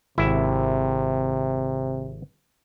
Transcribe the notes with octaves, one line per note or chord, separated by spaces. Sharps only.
G#1 C3 E4 E5